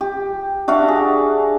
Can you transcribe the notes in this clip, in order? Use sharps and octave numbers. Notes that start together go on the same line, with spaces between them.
G4
D4 F#4 E5 F5
G#4